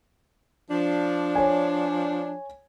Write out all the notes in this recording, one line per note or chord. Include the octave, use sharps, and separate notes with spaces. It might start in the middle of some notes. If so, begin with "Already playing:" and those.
F3 D4
C#5 G#5